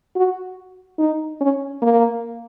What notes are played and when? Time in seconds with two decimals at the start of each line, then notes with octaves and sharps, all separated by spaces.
0.16 F#4
0.99 D#4
1.41 C#4
1.82 A#3